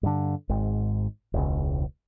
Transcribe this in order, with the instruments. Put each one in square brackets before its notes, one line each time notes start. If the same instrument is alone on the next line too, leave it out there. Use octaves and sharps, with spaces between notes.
[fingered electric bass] G2 D3
G#1 G#2
E1 C#2